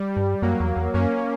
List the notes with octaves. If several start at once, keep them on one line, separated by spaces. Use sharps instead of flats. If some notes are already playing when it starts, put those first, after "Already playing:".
Already playing: G3
G2
F#2 F#3 A#3
E2
E2
F#2 A#3 C#4